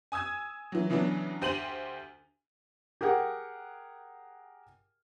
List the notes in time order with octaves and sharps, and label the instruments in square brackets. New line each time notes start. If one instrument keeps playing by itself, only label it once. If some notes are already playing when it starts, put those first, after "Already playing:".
[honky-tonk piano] G#5 D#6 E6 G#6
E3 F#3
C#3 E3 F#3 B3 D4
D2 G4 C5 D#7 F7 F#7
[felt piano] G4 G#4 A#4 F#5 G5